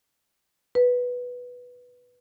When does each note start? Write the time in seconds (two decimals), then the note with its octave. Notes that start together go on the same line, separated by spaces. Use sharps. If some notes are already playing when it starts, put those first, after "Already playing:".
0.75 B4